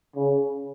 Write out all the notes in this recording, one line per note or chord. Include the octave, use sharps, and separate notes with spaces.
C#3